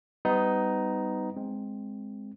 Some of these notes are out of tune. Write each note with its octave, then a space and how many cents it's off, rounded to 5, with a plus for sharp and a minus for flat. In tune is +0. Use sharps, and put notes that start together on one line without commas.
G3 +0 B3 +30 D#4 +0
G#3 +0 C4 +0